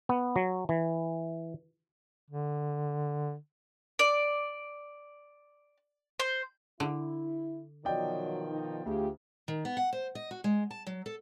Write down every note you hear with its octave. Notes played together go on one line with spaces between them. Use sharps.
B3
F#3
E3
D3
D5
C5
D3 E4
B2 D#3 F3 F#3 D5 D#5 G5
D#4
D2 F4 G4 G#4
D#3
B3
F#5
C5
D#5
F#4
G#3
A5
F#3
A4